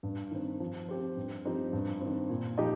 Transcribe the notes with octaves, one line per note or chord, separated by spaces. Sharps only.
G2
D#3 C4
F3
C4 G4 C5
G2
F3 C4 D#4 G4
G2
D#3 C4
A#2
F3 D#4 G4 D#5